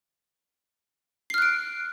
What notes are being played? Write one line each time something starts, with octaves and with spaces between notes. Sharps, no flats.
F6 F#6 C7 D7